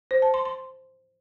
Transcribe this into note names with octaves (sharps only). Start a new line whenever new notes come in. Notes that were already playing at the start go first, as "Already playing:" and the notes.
C5
A5
C6
C6